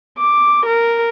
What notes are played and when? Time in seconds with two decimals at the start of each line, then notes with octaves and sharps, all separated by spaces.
0.18 D6
0.66 A#4